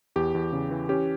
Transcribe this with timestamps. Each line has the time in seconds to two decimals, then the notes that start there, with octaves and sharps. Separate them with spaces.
0.16 E2 G4
0.35 E2
0.53 C#3
0.71 E3
0.89 C#4 G4